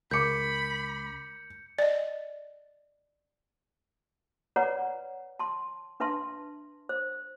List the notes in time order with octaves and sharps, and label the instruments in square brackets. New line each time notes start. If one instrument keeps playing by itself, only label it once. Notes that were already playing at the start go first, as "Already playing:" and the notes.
[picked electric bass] C#2 [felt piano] A#4 D6 [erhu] B5 [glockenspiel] G6 C#7
[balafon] D5 D#5
[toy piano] B4 C#5 D5 F#5 A#5
A5 C6
D4 B4 E5 A5 C6
C5